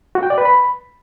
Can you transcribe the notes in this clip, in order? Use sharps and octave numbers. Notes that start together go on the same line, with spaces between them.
F#4
G5
D5
B4
B5